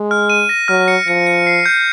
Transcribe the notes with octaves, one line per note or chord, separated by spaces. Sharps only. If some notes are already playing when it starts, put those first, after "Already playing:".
Already playing: G#3
F6
D#7
A#6
F#3 F6
C#7
F3 C#7
C#7
C7
G6